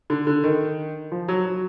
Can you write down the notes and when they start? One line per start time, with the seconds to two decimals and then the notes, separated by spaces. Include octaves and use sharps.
0.10 D3
0.27 D3
0.44 D#3
1.12 F3
1.28 F#3
1.46 F#3